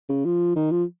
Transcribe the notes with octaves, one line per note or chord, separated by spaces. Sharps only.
C#3
F3
D#3
F3